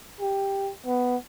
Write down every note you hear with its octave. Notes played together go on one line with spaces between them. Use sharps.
G4
B3